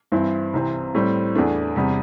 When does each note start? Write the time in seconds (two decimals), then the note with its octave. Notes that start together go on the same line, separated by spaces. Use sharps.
0.12 G2 E3 C4 E4
0.54 C2 C3 E3 C4
0.95 A2 G3 C4
1.35 E2 E3 A3 D4
1.76 E2 C3 G3